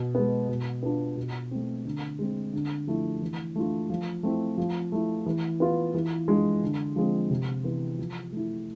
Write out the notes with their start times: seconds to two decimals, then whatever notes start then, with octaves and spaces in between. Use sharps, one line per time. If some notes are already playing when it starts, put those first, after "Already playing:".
Already playing: B2
0.15 G#3 B3
0.49 B2
0.83 B3 D4 F4
1.17 B2
1.51 A3 C4
1.85 D3
2.19 G#3 C4
2.53 D3
2.87 F3 A3 E4
3.22 E3
3.56 A3 D4 F4
3.90 F3
4.23 A3 C4 E4
4.58 F3
4.92 A3 E4
5.26 E3
5.60 B3 F4
5.94 E3
6.28 G#3 D4 F4
6.63 D3
6.96 F3 G#3 C4
7.30 C3
7.64 E3 B3
7.99 F3
8.32 A3 E4